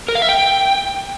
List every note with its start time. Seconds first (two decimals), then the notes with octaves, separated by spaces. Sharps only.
0.08 A#4
0.15 F5
0.22 E5
0.29 G5